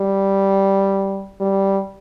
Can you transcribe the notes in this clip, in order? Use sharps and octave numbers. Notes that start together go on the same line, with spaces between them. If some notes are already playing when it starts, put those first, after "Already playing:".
Already playing: G3
G3